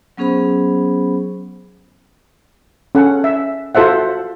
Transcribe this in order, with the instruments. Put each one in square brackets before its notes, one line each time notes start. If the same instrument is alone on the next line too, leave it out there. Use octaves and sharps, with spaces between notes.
[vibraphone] F#3 B3 C#4 G#4 C5 B5
[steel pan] C#4 A4 F#5
E5
F4 F#4 A4 C5 E5 F#5